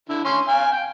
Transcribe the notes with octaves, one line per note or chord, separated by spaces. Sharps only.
D3 E4
C#4 C6
F5 G#5
G5